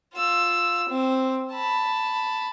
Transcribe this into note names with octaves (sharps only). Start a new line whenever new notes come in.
F4 E6
C4
A5 B5